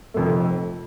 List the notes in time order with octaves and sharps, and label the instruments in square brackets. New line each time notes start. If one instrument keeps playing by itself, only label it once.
[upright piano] F1 F2 C3 A3